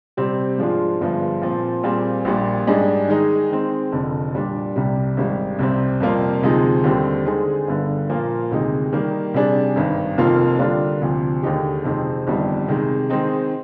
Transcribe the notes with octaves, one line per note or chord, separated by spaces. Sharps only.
C3 G3 C4 G4
G#2 F3 G#3 D4 F4
G1 G2 F3 G#3
A#2 F3 C4
A#2 G3 C4 F4 G#4
A#1 A#2 G3
G#2 G3 D4 G#4 D#5
D#3 G#3 D#4 G#4
D#3 G#3 C4
F1 F2 D3
A#2 G3 D4
C2 C3 G3
G#1 G#2 G3
C2 C3 G3 C4
F2 C3 G3 A#3 F4
D2 C3 F3 G#3 D#4
D#2 D3 G3 C4 G4
D3 G#3 C4 D#4 G#4
G1 G2 D3
A#2 F3 A#3 F4
D2 C3 D#3 G#3 D#4
D#3 G3 A#3
C3 G3 D4 G#4
G#1 G2 D#3
F1 F2 D#3 A#3 F4
D3 G3 A#3 D4 F4
D2 C3 F3
D#2 D3 G#3 D#4 G4
F2 C3 D#3 G#3 C4
G1 F2 D#3 G3
C3 D#3 G#3
D#3 G#3 C4 D#4